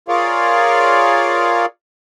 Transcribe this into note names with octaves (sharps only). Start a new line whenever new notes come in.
F4 G#4 A#4 C#5 D5 F5